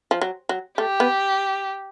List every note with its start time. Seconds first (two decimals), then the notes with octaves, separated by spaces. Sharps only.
0.11 F3
0.21 F#3
0.49 F#3
0.78 A3 G4
1.00 B3